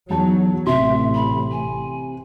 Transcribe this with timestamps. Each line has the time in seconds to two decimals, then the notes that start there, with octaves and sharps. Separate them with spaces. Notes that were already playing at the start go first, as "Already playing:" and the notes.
0.10 E2 F#3 D#4 A5
0.67 A1 C3 E5 C6
1.14 B5
1.52 G#5